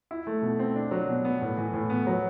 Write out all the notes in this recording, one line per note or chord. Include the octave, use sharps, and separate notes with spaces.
E4
A3
B2
C4
D4
F#3
B2
B3
A2
E3
A2
B3
F#3